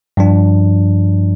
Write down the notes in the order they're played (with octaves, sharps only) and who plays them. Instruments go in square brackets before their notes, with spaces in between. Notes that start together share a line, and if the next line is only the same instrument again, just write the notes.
[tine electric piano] G2 F3 D4